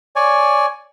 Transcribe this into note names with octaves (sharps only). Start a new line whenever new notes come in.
C#5 D5 G#5